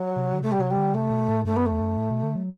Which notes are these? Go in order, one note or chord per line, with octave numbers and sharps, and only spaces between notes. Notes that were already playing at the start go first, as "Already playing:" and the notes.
Already playing: F#3
C3
D3
C3 A3
G3
C3 F#3
G3
D3
C3 A3
B2
A2
G2 A3
F#2 B3
A3
E2
G2
F#2
A2
B2
D3
F#3